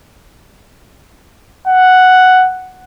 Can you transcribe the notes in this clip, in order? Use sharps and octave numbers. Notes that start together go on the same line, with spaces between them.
F#5